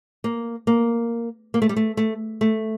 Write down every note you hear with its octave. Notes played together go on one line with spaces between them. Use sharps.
A#3
A#3
A#3
A3
G3
A3
A3
A3